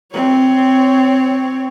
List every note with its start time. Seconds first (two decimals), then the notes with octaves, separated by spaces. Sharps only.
0.12 C4 C#5